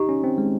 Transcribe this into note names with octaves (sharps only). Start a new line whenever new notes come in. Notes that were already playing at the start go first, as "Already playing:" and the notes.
Already playing: D#4 G4
C#4
C4
G#3